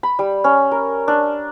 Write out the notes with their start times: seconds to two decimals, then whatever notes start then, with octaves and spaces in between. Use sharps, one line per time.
0.03 B5
0.19 G3
0.44 C#4
0.71 A#4
1.08 D4